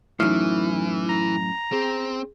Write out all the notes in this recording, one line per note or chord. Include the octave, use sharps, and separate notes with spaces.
F#2 A2 E3 D#4 F6
A#5
C4 G#4